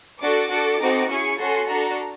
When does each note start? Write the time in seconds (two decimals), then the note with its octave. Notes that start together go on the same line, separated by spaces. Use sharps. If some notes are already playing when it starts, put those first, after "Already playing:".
0.21 D4 F#4 A4 D6
0.50 D4 F#4 A4
0.80 C4 D#4 F#4 A4
1.09 C#4 E4 G#4 C#6
1.39 C#4 F#4 A4 C6
1.68 D4 F#4 A4 A#5